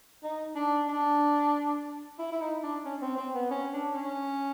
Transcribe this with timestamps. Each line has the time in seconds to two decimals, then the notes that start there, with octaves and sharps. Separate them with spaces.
0.23 D#4
0.55 D4
0.88 D4
2.19 E4
2.32 E4
2.41 D#4
2.63 D4
2.85 C#4
3.01 C4
3.17 C4
3.34 B3
3.51 C#4
3.73 D4
3.94 C#4